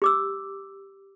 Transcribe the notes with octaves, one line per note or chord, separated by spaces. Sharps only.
G4 D6 E6